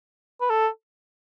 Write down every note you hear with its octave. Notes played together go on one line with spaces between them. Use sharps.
B4
A4